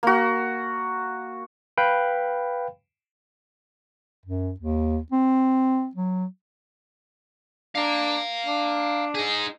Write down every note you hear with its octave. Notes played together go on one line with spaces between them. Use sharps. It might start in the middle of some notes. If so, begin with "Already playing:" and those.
A#3 F#4
B4 F5 G5 B5
F#2
D#2
C4
F#3
D4 F5 A#5
D4
D#4 G#4